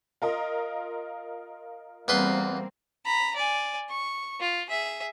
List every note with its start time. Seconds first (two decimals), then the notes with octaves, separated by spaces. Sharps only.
0.22 F4 A#4 D#5
2.08 E2 G3 A#3 C4 B4 C6
3.06 A#5 B5
3.36 D5 G#5
3.90 C#6
4.40 F4
4.70 G#4 E5